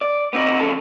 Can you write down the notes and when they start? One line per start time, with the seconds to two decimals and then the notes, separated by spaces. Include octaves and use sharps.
0.01 D5
0.33 B3 C4 D#4 F#4
0.60 F2 C#3 C#4 A4 A5